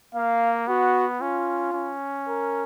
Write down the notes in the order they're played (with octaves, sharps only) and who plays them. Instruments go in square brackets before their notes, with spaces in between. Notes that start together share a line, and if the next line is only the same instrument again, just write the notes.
[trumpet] A#3 [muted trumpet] F5
[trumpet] B3 [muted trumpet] F#4
[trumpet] C#4 [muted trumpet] F4
[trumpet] C#4
[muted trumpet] A#4